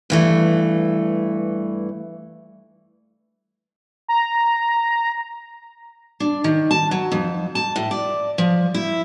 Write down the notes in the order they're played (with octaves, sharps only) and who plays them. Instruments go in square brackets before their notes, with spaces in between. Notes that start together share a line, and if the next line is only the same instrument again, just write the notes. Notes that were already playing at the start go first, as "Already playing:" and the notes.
[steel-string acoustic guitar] G2 E3 A3
[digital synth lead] A#5
[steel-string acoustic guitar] D4
D#3
A5
F#3
F2
A5
A2
D5
F3
E4